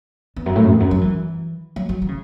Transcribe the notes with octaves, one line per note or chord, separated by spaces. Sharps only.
E2
F#2
A2
F#2
E2
F#2
F#3
E3
F#3
F#3
E3
C#3